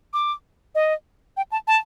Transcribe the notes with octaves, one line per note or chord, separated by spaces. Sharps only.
D6
D#5
G5
A5
A5